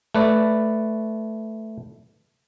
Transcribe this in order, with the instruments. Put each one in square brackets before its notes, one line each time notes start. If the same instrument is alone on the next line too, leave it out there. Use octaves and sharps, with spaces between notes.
[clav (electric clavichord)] A3 B4 D5